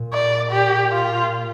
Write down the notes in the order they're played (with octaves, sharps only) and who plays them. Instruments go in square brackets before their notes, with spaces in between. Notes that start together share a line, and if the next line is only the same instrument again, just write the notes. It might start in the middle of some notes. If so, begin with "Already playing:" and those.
Already playing: [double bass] A#2
[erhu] D5
G4
F4